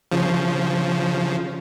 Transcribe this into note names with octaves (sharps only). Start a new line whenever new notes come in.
C#3 F3